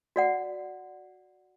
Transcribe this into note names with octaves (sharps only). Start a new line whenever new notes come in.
F#4 D5 F#5